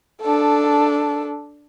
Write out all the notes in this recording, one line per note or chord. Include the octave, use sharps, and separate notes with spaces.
D4 A4